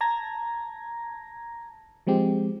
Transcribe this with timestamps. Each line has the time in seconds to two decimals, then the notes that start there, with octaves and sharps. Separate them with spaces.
0.01 A5 A#5 G#6 A#6
2.07 F3 G#3 C4 G4